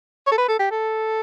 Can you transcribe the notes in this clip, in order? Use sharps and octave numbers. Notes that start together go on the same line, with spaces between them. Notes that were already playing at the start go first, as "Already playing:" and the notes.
C#5
A4
B4
A4
G4
A4